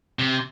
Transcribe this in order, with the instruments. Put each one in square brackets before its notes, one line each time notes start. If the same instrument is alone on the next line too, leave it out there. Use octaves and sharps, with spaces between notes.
[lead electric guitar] C3